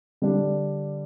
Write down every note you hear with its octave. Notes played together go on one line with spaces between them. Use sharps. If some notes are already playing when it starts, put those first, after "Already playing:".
D3 G3 D4